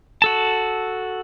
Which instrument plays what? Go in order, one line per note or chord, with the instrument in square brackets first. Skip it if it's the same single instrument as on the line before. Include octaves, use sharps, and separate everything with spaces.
[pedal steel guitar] F#4 A4 A5